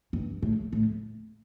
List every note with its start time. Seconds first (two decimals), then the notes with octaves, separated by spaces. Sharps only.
0.13 G2
0.42 A2
0.73 A2